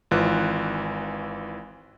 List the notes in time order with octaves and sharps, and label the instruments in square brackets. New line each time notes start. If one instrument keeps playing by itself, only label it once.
[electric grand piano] G#1 E3 F4 F#6